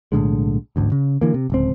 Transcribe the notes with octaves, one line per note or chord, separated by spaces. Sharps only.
B1 A2 D3 G#3
A1 D2 G#2
C#3
D3 E3 A#3
C3
D1 C#2 C4